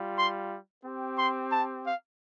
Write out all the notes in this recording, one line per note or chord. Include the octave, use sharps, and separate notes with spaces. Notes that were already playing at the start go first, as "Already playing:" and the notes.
Already playing: G3 F4
C6
C4 G4
C6
A5
F5